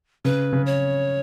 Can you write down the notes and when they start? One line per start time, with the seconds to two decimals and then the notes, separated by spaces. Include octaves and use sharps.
0.25 C#3 B4
0.53 C#3
0.66 C#5